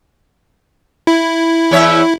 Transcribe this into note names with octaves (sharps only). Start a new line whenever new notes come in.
E4
E2 C#5 E5